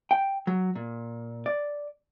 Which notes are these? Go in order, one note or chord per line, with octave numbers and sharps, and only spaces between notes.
G5
F#3
A#2
D5